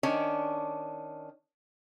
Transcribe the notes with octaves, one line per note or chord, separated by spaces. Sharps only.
D#3 C#4 D4 C#5